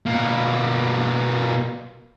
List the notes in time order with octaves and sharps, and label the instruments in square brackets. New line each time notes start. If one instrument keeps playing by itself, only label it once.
[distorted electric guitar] B2 A#3